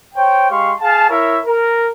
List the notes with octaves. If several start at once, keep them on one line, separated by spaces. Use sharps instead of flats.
C5 C#5 G5
G#3 G4 F5 C6 C#6
G#4 F5 A5
E4 A#4 C#5 E5
A#4